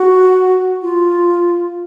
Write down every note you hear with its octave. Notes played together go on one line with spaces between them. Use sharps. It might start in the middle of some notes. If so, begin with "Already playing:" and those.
Already playing: F#4
F4